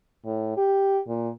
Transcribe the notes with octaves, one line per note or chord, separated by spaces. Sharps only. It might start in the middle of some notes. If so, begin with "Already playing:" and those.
A2
G4
A#2